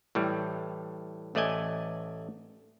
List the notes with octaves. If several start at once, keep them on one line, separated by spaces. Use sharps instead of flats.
A2 E3 G3
A1 A3 D5 D#5 G#5